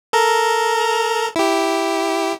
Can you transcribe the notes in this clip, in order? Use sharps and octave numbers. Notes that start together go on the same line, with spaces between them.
A4 A#4 A#5
E4 G4